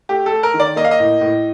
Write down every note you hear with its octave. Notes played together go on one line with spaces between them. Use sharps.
A3 G4
A4
A3
A#4
D#3
D5
A#3 D#5
F5
D#5
A2
A2